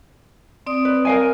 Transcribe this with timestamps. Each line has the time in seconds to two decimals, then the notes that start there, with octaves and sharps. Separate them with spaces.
0.66 C4 D5 D#6
0.85 B4
1.05 A#4 F5 G#5